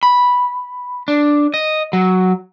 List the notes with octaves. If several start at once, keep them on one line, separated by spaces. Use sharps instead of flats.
B5
D4
D#5
F#3